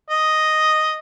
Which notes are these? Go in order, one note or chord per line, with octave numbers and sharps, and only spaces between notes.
D#5